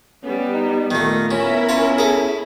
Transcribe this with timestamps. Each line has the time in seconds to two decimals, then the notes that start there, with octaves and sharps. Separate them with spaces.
0.23 G3 B3 C#4
0.53 D#4
0.91 A#2 D#3 A3 A#4
1.31 B3 C#4 E4 E5
1.69 C#4 F4 C#5 G#5
1.98 G#4 A4